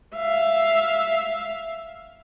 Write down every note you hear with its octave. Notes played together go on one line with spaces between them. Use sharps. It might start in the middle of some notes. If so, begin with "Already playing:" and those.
E5 F5